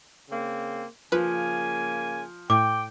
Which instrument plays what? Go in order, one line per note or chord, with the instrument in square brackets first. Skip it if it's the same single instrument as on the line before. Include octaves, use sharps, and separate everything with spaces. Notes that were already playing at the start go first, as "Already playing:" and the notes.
[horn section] C#3 A#3 C4
[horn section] C#3 A#3 G#5 [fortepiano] F3 [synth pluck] B4
[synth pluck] A2 [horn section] G5 [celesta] D6